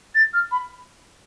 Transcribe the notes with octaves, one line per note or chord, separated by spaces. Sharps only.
A6
F6
B5